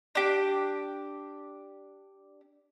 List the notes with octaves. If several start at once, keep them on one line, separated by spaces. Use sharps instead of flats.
D4 G4